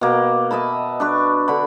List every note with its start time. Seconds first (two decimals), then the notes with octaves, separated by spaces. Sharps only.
0.01 B2 A#3
0.51 D#5 E5 A5 B5
1.00 D4 B4 C#6
1.48 D3 B5